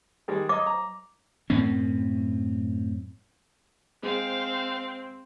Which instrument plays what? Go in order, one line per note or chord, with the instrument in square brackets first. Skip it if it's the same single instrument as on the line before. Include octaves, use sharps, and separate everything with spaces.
[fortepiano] D#3 G3 G#3
[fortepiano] C#5 D#5 A#5 [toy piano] D6
[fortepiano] A#5
[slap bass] F#2 A2 C4 C#4
[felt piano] G#3 [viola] C4 C5 [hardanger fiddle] F5